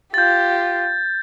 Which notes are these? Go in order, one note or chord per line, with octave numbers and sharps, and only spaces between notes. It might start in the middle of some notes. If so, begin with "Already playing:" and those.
F4 G4 G6 A6